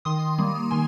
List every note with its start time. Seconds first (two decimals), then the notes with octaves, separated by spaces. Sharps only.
0.05 D#3 C6 D#6
0.39 G3 A#3
0.71 D#3 G#5 C6